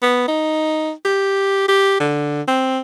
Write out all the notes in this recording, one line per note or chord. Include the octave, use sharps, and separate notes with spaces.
B3
D#4
G4
G4
D3
C4